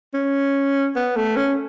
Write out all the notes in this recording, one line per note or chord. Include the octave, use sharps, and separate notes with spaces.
C#4
B3
A3
C#4